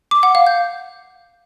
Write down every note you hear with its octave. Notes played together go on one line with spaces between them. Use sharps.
D6
F#5
F5
G6